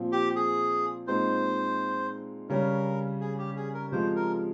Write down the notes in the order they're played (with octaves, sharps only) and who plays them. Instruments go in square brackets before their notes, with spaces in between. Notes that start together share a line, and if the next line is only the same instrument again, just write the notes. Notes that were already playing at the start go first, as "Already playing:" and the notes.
Already playing: [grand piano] A#2 F3 C4
[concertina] G4
G#4
[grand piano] A#2 G#3 C4 D#4 [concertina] C5
[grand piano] C#3 G3 C#4 [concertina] A#4
[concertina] G#4
G4
G#4
A#4
[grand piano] C3 F3 G#3 [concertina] C5
[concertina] A#4